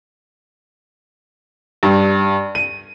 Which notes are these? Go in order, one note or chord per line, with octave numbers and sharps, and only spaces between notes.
G2
D#7